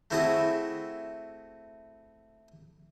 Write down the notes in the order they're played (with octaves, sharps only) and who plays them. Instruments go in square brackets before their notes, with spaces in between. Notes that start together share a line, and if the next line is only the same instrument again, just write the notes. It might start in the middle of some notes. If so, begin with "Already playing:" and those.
[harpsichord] A3 C4 E4 F#4 G#4 A5